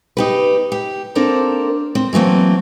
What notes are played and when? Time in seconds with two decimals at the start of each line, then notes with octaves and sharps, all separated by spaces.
0.17 D#4 G4 B4
0.72 G4
1.15 A#3 C4 D4 A4 A#4 C5
1.95 C4
2.13 E3 F#3 A3 A#3 C4